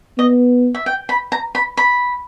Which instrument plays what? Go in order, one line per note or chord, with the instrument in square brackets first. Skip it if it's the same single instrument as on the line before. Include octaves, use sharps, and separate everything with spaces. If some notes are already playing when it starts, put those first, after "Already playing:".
[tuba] B3 [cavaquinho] D#5
[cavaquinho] E5
G5
B5
A#5
B5
B5